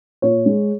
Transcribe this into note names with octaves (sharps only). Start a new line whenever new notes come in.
A#2 C#5
G#3